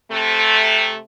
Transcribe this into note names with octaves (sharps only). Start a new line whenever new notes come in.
C3 A3